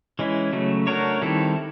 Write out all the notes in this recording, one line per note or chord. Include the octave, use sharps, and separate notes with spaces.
E3 G#3 C#4 E4
C#3 F#3 A3
A3 D4 F#4 A#4 C#5
D#3 G3 C4 E4 A4